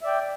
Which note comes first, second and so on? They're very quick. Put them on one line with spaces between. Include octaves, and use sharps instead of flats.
E5 D5 G5